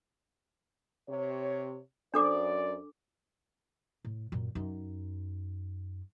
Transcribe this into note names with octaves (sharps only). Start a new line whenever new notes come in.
C3 C#5
F#2 D4 A4 C5 D5 D6
A2
F#2 A#2
F#2 D#4